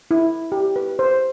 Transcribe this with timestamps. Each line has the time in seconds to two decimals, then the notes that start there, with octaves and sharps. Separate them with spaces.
0.11 E4
0.52 G4
0.76 B4
0.99 C5